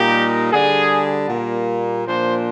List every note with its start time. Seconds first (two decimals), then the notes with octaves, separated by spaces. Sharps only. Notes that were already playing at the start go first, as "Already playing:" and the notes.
Already playing: A#2 G3 A#3 D#4 G4
0.52 D3 G3 D4 G#4
1.30 A#2 G3 A#3
2.07 A#2 F3 A#3 D4 C5